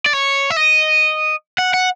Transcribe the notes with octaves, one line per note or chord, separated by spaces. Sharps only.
D5
C#5
E5
D#5
F#5
F#5